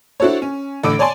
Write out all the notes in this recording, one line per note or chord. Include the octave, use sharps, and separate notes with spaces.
D4 E4 F#4 A4 C5 C#5
C#4
A1 A2 D3 D6 E6 D7
C#5 D5 G#5 A5 C6